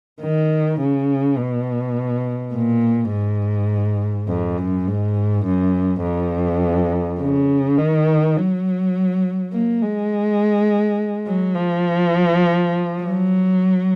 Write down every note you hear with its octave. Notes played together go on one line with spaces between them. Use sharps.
D#3
C#3
B2
A#2
G#2
F2
F#2
G#2
F#2
F2
C#3
D#3
F#3
A#3
G#3
F#3
F3
F#3